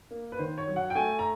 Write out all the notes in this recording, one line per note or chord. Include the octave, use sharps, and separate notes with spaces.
A#3
B4
D#3 C5
C#5
F#3
F#5
G5
A3 G#5
A#5